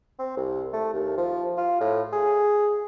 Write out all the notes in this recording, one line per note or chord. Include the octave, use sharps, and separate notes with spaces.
C4
C2
A3
D#2
F3
F4
A2
G#4